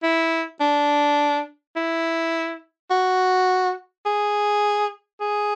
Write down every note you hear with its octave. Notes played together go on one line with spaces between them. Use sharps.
E4
D4
E4
F#4
G#4
G#4